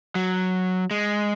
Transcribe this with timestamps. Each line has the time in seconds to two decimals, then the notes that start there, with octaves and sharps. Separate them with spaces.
0.15 F#3
0.91 G#3